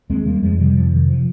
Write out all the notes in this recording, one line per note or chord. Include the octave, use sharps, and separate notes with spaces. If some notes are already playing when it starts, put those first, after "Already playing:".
D#2 G#3 C4
C#3 G3 A#3
F2 F3 G#3
C3 D#3 G3
D#3
F2 F3
C3 D#3
F3